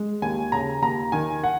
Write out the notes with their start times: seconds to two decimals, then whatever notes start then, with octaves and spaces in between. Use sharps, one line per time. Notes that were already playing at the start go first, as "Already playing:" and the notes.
Already playing: G#3
0.22 D#2 G#5
0.52 C#3 A#5
0.82 D#2 A#5
1.12 D#3 G#5
1.44 F#5